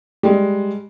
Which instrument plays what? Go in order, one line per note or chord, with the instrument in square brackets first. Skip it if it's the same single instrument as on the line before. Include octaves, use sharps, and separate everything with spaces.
[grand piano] G3 G#3